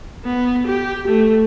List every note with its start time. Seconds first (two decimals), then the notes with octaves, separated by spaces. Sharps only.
0.25 B3
0.67 G4
1.08 A3